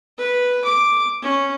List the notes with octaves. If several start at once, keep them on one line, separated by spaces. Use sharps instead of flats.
B4
D6
C#4